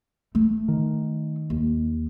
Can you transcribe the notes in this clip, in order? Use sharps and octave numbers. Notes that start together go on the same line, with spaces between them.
A3
D#3
D#2